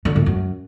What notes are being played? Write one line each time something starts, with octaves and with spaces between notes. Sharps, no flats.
D3
A2
F#2